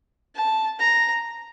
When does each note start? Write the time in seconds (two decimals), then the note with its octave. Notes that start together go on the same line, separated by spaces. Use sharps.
0.35 A5
0.79 A#5